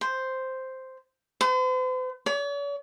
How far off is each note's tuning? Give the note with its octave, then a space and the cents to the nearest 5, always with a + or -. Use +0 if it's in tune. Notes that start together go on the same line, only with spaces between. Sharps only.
C5 +0
C5 -45
C#5 +45